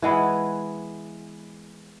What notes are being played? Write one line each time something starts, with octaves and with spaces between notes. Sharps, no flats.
E3 G#3 B3